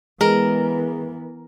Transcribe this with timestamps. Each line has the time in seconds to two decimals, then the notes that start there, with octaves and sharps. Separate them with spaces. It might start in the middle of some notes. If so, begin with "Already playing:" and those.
0.21 E3 G#3 B3 A#4